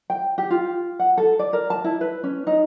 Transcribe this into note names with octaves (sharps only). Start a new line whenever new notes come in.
G5
G4
F4
F#5
A4
D5
A#4
A5
E4
B4
C#4
D#4